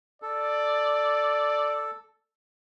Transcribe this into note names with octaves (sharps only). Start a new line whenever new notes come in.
A4 D5